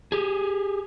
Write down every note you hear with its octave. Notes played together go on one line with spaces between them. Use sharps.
G4 G#4